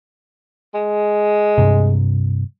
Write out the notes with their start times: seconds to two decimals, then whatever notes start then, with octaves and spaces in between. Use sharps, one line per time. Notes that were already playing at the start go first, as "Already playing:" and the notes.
0.74 G#3
1.58 G2 C3